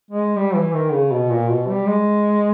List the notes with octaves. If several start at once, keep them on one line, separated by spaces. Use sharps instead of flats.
G#3
G3
E3
D#3
C#3
B2
A#2
B2
G3
G#3